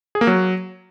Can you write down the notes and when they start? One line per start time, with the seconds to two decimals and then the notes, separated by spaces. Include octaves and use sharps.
0.15 G#4
0.21 A#3
0.27 F#3